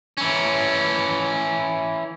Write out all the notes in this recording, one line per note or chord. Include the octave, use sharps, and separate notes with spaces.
E3 C#4